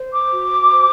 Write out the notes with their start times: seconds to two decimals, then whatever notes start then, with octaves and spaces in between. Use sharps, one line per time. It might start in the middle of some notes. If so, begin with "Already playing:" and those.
Already playing: C5
0.12 D6
0.32 F#4
0.72 C5